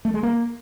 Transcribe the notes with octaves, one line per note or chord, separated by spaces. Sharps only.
A3
G#3
A#3